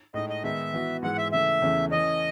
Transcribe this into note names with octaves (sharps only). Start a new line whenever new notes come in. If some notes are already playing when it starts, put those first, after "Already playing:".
A2 G#3 D#4 D#5
D#5
D#3 G#3 B3 D#4 E5
E3 B3 F#4
G#2 E3 G#3 F#5
E5
C#3 E3 A3 E5
E2 C#3 E3 A3 C#4
E3 A3 C#4 D#5